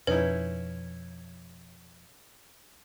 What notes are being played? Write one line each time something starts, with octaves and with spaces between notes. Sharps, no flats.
F2 B2 C#4 D#4 E4 B4